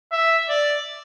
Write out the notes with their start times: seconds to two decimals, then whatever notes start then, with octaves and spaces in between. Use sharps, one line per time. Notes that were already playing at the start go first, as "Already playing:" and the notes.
0.12 E5
0.49 D5